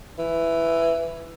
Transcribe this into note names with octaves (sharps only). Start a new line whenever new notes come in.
E3